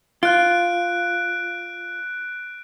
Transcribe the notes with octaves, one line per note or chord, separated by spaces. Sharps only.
F4 F#6 D7